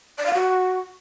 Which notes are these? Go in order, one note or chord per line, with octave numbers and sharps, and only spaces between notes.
D5
F5
F#4